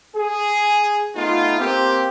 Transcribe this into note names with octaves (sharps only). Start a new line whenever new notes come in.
G#4
A3 B3 D#4 F4
A#3 C4 G4